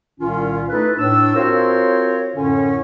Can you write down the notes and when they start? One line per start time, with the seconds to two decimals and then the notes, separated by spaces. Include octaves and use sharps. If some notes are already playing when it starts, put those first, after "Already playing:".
0.20 C2 A#2 D#3 C#4 F4
0.70 A3 D#4 E4 A4 B4
0.98 A2 D4 E6
1.36 C4 F4 F#4 A#4 C5 C#5
2.37 F#2 A2 D3 C#4